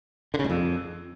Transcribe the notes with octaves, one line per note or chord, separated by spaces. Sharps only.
D3
C#3
G#2
F2